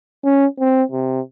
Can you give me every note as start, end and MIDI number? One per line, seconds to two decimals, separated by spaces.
0.24 0.46 61
0.59 0.83 60
0.91 1.20 48